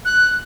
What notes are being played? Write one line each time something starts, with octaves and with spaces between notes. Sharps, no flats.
F#6